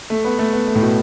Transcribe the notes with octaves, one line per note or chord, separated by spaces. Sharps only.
A3
B3
A3
B3
A3
A2
B2